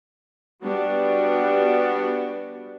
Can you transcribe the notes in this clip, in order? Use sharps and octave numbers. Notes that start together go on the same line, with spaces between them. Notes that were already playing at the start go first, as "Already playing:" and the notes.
G3 B3 D4 F#4